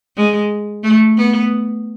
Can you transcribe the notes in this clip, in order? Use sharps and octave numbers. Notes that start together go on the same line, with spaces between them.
G#3
A3
B3